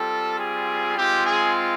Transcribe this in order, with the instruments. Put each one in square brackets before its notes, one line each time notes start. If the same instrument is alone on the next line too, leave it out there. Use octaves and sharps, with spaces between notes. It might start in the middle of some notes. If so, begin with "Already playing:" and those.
Already playing: [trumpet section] G3 C4 F4 A4
G#4
G#3 C4 F4 G4
G#4